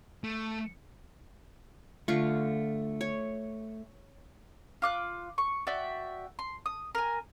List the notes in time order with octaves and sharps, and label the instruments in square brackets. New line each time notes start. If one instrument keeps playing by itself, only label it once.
[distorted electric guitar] A3
[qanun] D3 F4 C#6 [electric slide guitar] A3
[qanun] C#5
[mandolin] F4 D6 F#6
C#6
F#4 D5 E5 G5
C6
D#6
A#4 G#5